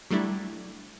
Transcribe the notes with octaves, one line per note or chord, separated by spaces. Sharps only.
F#3 G3 A3 D4 E4